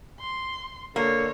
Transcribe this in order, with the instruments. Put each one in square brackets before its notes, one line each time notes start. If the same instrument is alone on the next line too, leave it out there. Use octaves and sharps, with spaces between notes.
[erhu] C6
[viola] D3 [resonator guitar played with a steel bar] A#3 [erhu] C#5